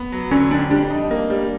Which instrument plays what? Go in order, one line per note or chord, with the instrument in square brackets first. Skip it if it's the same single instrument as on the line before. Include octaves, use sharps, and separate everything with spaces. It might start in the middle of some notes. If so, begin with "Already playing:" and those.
Already playing: [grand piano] B3
F#3
[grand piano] D3 [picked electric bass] C#4
[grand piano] F2 [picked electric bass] D4
[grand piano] G3 [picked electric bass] D4
[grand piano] D#4
A#3
G3